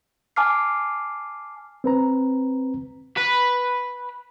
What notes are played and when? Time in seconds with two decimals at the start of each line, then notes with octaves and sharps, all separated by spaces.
0.36 G#5 A5 D6 F6 C7
1.84 C4 B4 A#5
3.18 B4